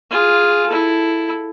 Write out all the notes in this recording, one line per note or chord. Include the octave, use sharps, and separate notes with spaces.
F4 G#4
E4 A4